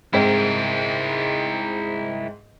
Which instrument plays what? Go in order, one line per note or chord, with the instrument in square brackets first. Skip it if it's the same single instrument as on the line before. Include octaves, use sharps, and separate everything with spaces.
[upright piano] G#2 G#3 C4 [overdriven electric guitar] E4 A#4